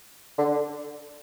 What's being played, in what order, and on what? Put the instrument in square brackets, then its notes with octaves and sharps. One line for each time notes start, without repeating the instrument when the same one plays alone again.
[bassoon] D3